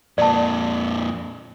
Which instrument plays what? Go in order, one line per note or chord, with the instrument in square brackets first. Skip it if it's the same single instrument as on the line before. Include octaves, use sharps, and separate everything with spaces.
[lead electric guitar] F2 A#2 [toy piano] D5 A5